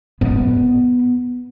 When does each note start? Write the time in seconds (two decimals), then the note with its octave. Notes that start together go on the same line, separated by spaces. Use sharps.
0.21 B3